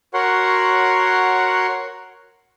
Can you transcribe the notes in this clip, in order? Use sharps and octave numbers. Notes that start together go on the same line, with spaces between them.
F#4 A#4 C#5 F#5 C6